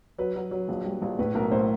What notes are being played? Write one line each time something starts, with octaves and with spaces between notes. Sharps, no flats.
F#3 B4
F#3
F#3
A#1
G3
A#1
A2 B4
B1 A#4
A2 C5